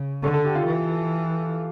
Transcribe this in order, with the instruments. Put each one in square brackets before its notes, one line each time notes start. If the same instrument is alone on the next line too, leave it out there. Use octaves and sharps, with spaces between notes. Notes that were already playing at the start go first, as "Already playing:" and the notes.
Already playing: [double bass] C#3
[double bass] D3 [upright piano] A4
[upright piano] A4
G4
F4
[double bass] E3